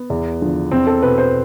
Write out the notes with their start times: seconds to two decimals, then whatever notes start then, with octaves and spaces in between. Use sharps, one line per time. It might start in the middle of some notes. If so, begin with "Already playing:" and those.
Already playing: B3
0.10 E2
0.41 D3 F3
0.71 E2 C4
0.87 A4
1.02 B2 B4
1.18 C5